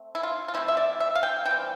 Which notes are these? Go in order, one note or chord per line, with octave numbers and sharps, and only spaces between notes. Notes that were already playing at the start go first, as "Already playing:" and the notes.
Already playing: A3 C4
E4
F4
F4
F3 A3 C4 E4
E5
D5
E5
F5
G5
E3 G3 C4 G5